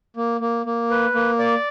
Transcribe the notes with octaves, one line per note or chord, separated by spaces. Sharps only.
A#3
A#3
A#3
B4
A#3
D5